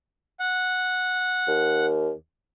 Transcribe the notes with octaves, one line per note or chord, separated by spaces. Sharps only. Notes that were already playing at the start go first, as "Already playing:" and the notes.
F#5
D#2